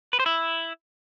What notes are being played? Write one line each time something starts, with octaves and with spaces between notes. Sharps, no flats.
B4
C5
E4